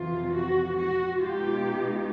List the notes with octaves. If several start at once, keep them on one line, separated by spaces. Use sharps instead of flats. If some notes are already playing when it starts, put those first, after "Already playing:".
Already playing: F2 C3 E3 F4
F#4
F#4
B2 G#3 B3 D#4 F4 G4